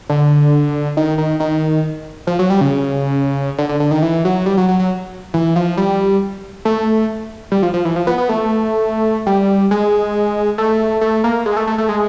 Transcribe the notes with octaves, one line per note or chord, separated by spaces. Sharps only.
D3
D#3
D#3
D#3
F3
F#3
G3
C#3
D3
D3
D3
D#3
E3
F#3
G3
F#3
F#3
F#3
E3
F3
G3
A3
G3
F3
F3
E3
F3
B3
B3
A3
G3
G#3
A3
A3
A#3
G#3
A3
A3
A3
G#3